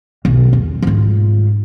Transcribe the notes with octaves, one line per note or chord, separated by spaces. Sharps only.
B1
E2
G#2 F4